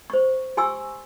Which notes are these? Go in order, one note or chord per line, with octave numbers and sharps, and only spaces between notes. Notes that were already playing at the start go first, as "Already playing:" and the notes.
C5 C#6
G4 G#5 C6 C#6 E6